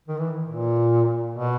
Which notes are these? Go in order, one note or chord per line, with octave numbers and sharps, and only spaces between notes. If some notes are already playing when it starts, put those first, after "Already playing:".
D#3
E3
A#2
B2